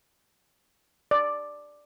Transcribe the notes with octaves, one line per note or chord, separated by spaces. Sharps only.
D5